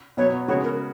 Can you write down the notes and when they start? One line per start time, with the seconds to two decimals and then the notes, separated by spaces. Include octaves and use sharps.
0.17 B2 F#3 B3 C#5
0.48 C#3 G#3 B3 F#4 C#5
0.64 A#4